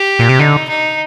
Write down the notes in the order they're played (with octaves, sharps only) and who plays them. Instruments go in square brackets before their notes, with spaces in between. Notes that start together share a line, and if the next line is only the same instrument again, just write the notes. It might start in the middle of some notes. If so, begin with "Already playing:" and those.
Already playing: [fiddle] G4
[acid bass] A#2
C3
[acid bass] D3 [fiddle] D#4
[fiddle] D#4